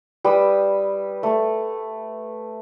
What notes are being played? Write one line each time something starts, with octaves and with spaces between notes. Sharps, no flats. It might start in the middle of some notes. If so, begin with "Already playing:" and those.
G3 B4 D#6 E6
A3